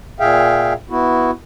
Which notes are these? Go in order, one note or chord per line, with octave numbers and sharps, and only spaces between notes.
A#2 G#4 E5 F5 G5
B3 E4 F#4